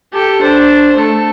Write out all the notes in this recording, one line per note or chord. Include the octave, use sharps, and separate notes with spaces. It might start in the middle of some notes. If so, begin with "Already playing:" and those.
G4 A4
D4 C5
A3 A4